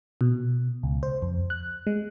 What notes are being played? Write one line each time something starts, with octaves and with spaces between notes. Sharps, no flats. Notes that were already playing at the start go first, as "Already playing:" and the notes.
B2
C#2
C5
F2
F#6
G#3